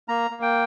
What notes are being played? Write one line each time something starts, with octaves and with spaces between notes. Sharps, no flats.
A#3 A#5
A#3
G5